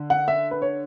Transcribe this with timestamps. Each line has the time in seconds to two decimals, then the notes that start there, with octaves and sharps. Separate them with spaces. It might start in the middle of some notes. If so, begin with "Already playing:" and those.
Already playing: D3
0.10 F#5
0.28 E5
0.51 B4
0.62 C#5